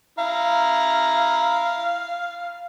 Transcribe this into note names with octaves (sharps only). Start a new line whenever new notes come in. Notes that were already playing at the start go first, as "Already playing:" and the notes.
E4 F5 A#5